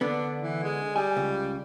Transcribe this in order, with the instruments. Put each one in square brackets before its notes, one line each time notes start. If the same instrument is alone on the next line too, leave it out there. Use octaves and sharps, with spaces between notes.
[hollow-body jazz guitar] D3 B3 [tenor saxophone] D4
[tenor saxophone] E3
G#3
[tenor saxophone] G3 [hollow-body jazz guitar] G#5
[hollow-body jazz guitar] C#2